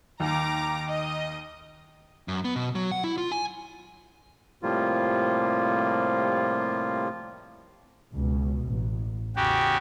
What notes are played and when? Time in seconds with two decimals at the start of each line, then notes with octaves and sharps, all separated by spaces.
0.20 D#2 A#5 D6
0.88 D#5
2.28 F#2
2.45 B3
2.56 B2
2.75 F#3
2.92 F#5
3.04 E4
3.18 F4
3.32 G#5
4.63 A2 C3 F3 G3 A#3 F4
8.13 C#2 B2
8.67 A1
9.36 E2 C#3 F#4 G4